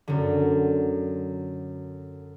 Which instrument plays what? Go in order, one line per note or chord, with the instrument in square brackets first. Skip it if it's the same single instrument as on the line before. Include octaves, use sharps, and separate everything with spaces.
[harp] F#2 D3